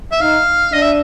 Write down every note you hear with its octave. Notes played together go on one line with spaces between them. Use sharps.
E5
D#4 F5
D4 D#5
E5